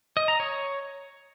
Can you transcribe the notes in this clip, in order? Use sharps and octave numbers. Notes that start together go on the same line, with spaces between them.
D#5
A#5
C#5